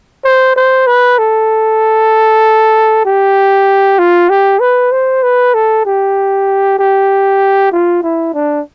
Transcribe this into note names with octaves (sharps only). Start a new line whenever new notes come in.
C5
C5
B4
A4
G4
F4
G4
B4
C5
B4
A4
G4
G4
F4
E4
D4